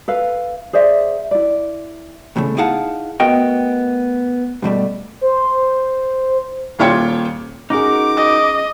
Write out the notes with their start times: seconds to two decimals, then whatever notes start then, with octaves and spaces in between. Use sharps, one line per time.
0.08 A4 B4 F5
0.73 G#4 C5 D5 E5
1.31 E4 D5
2.36 C2 A2 C#3 A3
2.57 D#4 E4 G#4 F5 F#5 A5
3.20 A3 B3 F#4 A#4 D#5 G5
4.62 G2 B2 G3 A3
5.21 C5
6.79 D#1 A#2 F4 C#5 G5 C#7
7.70 C#4 D#4 F#4 G#4 A#4 D6
8.17 D#5